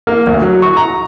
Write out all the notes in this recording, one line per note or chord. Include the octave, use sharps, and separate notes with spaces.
A#3
D2
F#3
C#6
A#5